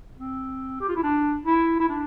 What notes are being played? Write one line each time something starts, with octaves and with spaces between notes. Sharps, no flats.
C4
G4
F4
E4
D4
E4
E4
D4